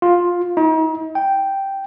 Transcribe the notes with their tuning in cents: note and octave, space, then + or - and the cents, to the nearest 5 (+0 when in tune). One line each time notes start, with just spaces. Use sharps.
F4 +10
D#4 +40
G5 -5